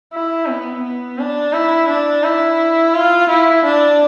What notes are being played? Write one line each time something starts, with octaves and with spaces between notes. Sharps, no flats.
E4
B3
B3
D4
E4
D4
E4
F4
E4
D4